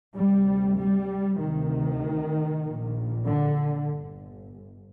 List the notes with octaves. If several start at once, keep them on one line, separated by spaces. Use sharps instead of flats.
D2 C3 G3
G3
D2 C3 D#3
A#1 A#2
D3
G1